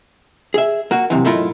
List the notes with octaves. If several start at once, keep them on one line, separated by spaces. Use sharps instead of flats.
G#4 E5
A#3 F#4
F#2 C3 E3
B1 G#2 A3 E4 F4 A#4